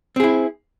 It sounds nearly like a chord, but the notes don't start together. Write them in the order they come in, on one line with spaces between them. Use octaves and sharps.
C4 G#4 E4